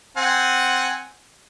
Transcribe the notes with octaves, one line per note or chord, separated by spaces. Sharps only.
C4 F#5 G#5